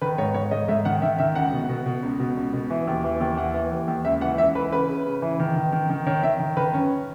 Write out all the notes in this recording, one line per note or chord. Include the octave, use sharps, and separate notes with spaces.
D#3 B4
G#2 C#5
G#2 C#5
G#2 D#5
G#2 E5
D#3 F#5
D#3 E5
D#3 E5
C#2 F#5
B2
B2
B2
C#2
B2
C#2
B2
E3
D#2
E3
D#2
E3 F#5
E3
D#2
D#2
C#2 E5
E3 F#5
C#2 E5
E3 B4
C#3 B4
C#3
C#3
E3
D#3
D#3
D#3
D#3
D#3 C#5
D#3 E5
D#3
D#3 B4
F#2 C#4